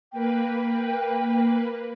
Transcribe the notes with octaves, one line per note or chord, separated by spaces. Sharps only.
A#3 B4 G5